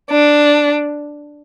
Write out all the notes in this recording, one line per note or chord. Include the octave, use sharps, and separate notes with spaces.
D4